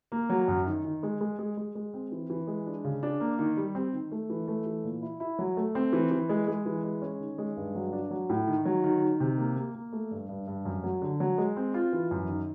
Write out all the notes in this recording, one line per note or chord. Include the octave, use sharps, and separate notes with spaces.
A#3
F#3
F#2
D#3
D#3
G#3
G#3
G#3
G#3
G#3
C4
E3
E3
G#3
D4
C#3
D4
A#3
D#3
G3
C4
D#3
A3
E3
A3
E3
A#2
E4
E4
F#3
A3
C4
E3
E3
G#3
G#3
E3
G#3
C#4
D#3
G#3
G2
F#3
D4
F#3
A2
D#3
F#3
D#3
D#3
C3
A#3
A#3
A#3
A3
G2
G2
G2
F#2
F#3
D3
F#3
G#3
C4
F4
E3
F#2
D#3